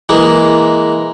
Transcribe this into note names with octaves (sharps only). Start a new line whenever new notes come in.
E3 G#3 A#3